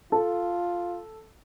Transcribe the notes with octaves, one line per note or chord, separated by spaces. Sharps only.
F4 A4